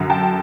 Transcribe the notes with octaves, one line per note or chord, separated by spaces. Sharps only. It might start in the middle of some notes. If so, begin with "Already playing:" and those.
Already playing: F#2 D3 F#3
G5 A5